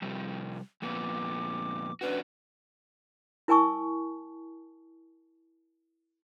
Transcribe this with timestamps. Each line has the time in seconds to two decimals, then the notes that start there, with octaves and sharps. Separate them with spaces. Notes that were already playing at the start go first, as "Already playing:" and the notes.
0.02 C3 F3 G3
0.82 F2 A#2 B3 D6
2.01 C#4 D4 F#4 B4
3.48 E4 A#4 G#5 A5 C#6 D#6